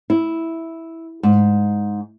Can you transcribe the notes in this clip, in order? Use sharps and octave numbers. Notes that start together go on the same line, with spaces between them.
E4
G#2